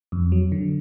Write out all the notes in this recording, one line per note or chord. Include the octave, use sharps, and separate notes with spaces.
F2
F#3
D3